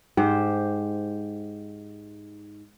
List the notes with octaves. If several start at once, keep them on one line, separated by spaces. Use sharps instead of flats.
G#2 G4 C5